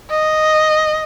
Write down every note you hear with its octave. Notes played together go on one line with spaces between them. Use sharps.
D#5